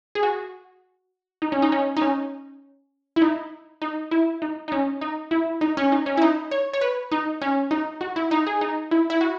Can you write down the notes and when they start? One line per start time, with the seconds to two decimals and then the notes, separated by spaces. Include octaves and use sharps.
0.15 G#4
0.23 F#4
1.42 D#4
1.52 C#4
1.62 D#4
1.72 C#4
1.97 D#4
2.02 C#4
3.16 E4
3.22 D#4
3.82 D#4
4.11 E4
4.42 D#4
4.68 D#4
4.72 C#4
5.01 D#4
5.31 E4
5.61 D#4
5.77 C#4
5.92 D#4
6.06 C#4
6.17 E4
6.22 D#4
6.51 C#5
6.73 C#5
6.81 B4
7.11 D#4
7.41 C#4
7.71 D#4
8.01 F#4
8.16 E4
8.31 D#4
8.47 G#4
8.61 D#4
8.91 E4
9.10 E4
9.21 F#4